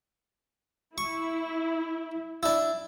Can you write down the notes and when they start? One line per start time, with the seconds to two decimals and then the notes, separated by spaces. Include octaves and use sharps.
0.98 E4 C#6
2.43 D4 E4